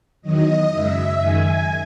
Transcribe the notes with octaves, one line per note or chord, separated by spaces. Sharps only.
E2 D#3 F#3 D#5
F#2 C#3 G#3 E5
F#2 D#3 G#3 G#5